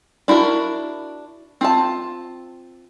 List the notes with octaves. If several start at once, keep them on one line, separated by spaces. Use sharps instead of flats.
D4 E4 F#4 A#4
C4 F4 A5